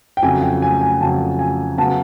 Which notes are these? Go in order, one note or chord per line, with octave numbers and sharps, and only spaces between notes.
G5
F2 C#3 F#3 G#5
G5
G#5
G#5
F2 C#3 F#3 A5
G#5
C#3 F#3 B3 A5